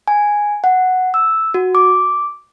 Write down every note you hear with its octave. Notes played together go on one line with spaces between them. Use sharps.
G#5
F#5
E6
F#4
D6